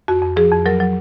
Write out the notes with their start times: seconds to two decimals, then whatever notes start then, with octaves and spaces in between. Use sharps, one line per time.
0.08 F2 F#4
0.22 F2
0.36 F3 G#4
0.51 F2
0.66 F#3 A#4
0.80 F#3